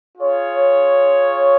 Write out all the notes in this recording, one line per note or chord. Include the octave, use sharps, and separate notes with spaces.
F4 G#4 C#5